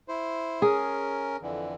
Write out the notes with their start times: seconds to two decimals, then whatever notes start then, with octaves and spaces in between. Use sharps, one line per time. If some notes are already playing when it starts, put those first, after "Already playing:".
0.08 E4 C5
0.62 C#4 G#4 A#4
1.42 F2 D3 E3